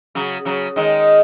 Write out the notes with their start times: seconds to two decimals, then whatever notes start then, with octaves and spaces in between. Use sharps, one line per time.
0.15 C#3 F#3
0.45 C#3 F#3
0.76 D#3 G#3